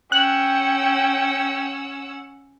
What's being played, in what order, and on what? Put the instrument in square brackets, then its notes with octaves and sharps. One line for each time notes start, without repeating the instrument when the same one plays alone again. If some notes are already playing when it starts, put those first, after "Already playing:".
[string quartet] C#4 F#5 E6 [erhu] G5 [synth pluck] F#6